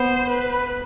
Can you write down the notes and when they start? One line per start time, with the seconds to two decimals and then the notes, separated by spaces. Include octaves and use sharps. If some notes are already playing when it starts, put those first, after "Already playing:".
Already playing: B3 C5
0.29 B4